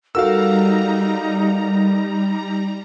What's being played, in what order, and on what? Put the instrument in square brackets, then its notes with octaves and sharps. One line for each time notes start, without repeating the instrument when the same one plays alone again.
[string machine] G3 A#5 [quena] D#4 [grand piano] F#4 A4 A#4 [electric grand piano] F5 E6